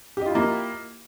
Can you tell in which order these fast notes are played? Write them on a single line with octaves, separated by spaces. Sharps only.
G4 D#5 F4 E4 A#3